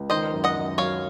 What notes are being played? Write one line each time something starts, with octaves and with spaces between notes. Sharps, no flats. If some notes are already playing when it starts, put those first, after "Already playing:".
Already playing: C#2
D#3 C5 D#5
F#2
D#5 F#5
F#2
F#3 C#5 F5